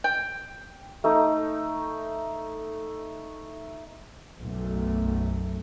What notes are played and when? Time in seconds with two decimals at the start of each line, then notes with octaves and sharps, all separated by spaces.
0.04 G5
1.04 A3 D#4
4.38 B1 F#2 A3